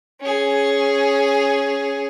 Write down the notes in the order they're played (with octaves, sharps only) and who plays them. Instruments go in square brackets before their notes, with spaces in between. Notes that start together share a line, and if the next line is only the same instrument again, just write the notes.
[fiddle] C#4 G#4